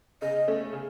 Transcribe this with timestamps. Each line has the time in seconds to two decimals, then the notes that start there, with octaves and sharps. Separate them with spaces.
0.22 C#3 D#5
0.48 A3 C#4
0.73 C#3